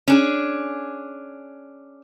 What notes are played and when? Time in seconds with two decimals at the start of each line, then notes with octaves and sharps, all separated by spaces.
0.08 C#4 D4 G#4